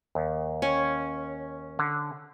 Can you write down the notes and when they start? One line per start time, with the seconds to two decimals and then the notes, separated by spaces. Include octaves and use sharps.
0.15 D#2
0.62 C#4
1.79 D3